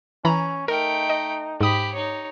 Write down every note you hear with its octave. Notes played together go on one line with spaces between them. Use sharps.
E3 C#4 A#5 B5
A3 D#4 A#4 G5
D#5
G#2 G4 B5 D#6
D#4 C#5